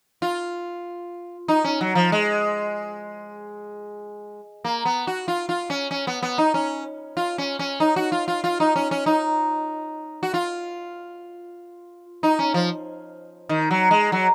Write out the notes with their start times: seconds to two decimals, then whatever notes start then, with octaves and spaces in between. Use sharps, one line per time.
0.22 F4
1.48 D#4
1.64 C#4
1.81 F#3
1.95 F3
2.12 G#3
4.64 A#3
4.85 B3
5.07 F#4
5.28 F4
5.49 F4
5.70 C#4
5.91 C#4
6.07 B3
6.23 B3
6.38 D#4
6.54 C#4
7.17 F4
7.38 C#4
7.59 C#4
7.80 D#4
7.96 F#4
8.12 F4
8.28 F4
8.44 F4
8.60 D#4
8.76 C#4
8.91 C#4
9.06 D#4
10.23 F#4
10.34 F4
12.23 D#4
12.39 C#4
12.54 F3
13.49 D#3
13.71 F#3
13.91 G#3
14.12 F#3